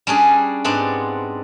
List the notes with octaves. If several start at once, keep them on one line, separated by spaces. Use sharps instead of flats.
G3 C#4 D4 G#4
G#2 B3 C4 D4 F#5